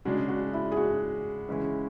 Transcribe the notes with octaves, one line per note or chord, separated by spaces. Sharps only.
C#3 G#3 D4 F#4
F#4
E4
G#4
F#4
C#3 E3 G#3 C#4 E4